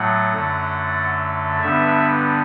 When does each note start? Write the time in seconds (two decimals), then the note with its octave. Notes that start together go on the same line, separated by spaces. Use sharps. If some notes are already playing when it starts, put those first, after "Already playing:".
Already playing: A2 F#3 A3 F#5
0.33 F#2 D3 A3
1.62 G2 D3 G3 B3 E5